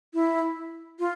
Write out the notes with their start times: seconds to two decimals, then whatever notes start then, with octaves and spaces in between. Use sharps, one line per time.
0.14 E4
0.99 F4